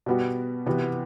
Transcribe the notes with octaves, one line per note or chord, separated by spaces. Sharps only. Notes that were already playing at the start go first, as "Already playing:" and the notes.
B2 G3 B3 F#4
C3 E3 B3 F#4